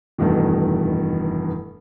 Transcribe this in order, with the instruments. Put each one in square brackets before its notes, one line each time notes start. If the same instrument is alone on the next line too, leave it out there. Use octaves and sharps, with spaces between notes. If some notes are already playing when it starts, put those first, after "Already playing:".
[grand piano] F1 E2 G2 B2 D#3